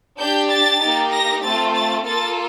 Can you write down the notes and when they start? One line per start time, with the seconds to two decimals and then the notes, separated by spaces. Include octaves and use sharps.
0.19 D4 G4 G6
0.50 A6
0.81 A#3 D#4 G4
1.12 A#6
1.42 A3 C4 F4 A6
1.74 A6
2.04 A#3 F4 A4 A6